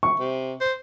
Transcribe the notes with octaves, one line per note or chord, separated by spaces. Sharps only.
C#6
C3
C5